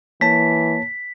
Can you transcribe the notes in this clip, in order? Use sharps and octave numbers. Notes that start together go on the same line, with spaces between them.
E3 A#3 C#5 A5 B6